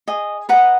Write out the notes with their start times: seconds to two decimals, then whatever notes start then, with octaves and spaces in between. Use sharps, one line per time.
0.08 G#4 D#5
0.49 B4 D#5 F#5 A#5